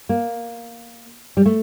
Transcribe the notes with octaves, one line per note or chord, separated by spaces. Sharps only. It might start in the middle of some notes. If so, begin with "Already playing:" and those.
A#3
G3
A3